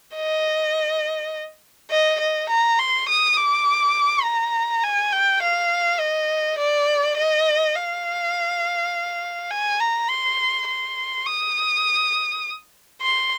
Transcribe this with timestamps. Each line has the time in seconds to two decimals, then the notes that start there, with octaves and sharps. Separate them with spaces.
0.16 D#5
1.91 D#5
2.20 D#5
2.49 A#5
2.79 C6
3.08 D#6
3.37 D6
4.24 A#5
4.83 G#5
5.13 G5
5.42 F5
6.00 D#5
6.58 D5
7.17 D#5
7.75 F5
9.51 G#5
9.80 A#5
10.09 C6
10.67 C6
11.26 D#6
13.02 C6